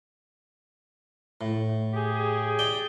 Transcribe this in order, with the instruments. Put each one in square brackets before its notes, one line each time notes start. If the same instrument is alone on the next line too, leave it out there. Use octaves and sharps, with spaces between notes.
[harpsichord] A2
[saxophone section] G4 G#4
[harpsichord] D5 G5